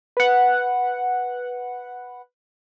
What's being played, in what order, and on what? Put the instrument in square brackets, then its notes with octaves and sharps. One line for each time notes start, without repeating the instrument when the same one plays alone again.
[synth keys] B4 F#5